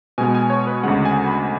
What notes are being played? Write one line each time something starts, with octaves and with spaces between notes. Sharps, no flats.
B2 G#3 B3 G#5
G#5
C#5
B4
D2 C#3 G#3 F#5
G#5
B5